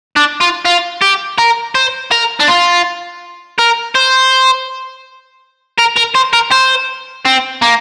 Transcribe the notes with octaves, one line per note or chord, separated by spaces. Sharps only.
D4
F4
F4
G4
A#4
C5
A#4
D4
F4
A#4
C5
A#4
A#4
C5
A#4
C5
C4
A#3